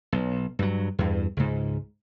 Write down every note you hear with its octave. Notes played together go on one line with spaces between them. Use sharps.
B1
G2 F#3
E2 G2
C#2 G#2